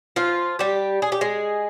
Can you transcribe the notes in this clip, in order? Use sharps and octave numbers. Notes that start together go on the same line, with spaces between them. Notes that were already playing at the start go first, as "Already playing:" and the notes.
F3 F4
G3 G4
G#4
G4
G#3 G#4